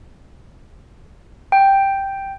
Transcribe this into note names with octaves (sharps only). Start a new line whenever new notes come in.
G5